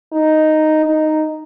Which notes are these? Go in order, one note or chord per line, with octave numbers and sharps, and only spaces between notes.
D#4
D#4